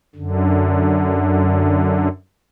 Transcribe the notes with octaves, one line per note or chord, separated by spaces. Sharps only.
F#2 D3